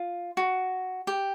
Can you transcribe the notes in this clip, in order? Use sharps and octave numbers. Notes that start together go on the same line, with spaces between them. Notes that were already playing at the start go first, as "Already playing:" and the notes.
Already playing: F4
F#4
G4